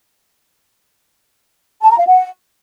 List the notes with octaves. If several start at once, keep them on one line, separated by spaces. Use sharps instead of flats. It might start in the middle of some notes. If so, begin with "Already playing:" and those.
A5
A#5
F5
F#5